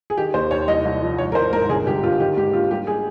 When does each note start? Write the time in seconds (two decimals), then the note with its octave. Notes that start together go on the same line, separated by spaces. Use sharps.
0.10 G#4
0.17 D#3 G4
0.34 D#2 C5
0.51 D#2 C#5
0.68 C2 D#5
0.85 C2
1.01 F3
1.18 G#1 C#5
1.32 A#4
1.35 G#1 C5
1.52 G#2 A#4
1.69 G1 G#4
1.86 G1 G4
2.03 G1 F4
2.20 D#3 G4
2.37 G#2 G4
2.53 A#3 F4
2.71 G3 G4
2.87 G3 G#4